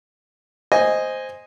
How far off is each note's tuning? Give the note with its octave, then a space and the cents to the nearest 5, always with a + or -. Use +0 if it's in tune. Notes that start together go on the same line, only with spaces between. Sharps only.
C5 +0 D#5 +0 G#5 -10